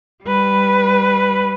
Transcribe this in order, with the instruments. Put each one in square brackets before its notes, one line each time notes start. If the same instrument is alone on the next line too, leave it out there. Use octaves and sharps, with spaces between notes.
[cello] G3 B4